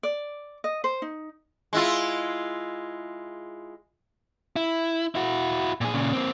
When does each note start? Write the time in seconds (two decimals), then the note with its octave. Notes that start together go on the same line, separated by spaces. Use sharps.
0.03 D5
0.64 D#5
0.84 C5
1.02 D#4
1.73 G#3 E4 F4
4.56 E4
5.15 E4 F#4
5.81 A#2 G#4
5.94 A#2 C#3
6.13 A#3 C4